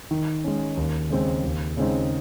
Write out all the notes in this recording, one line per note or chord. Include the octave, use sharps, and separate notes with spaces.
D#3
G#3 C#4
D#2
C#3 G#3 C4
D#2
C#3 G#3 C4 D#4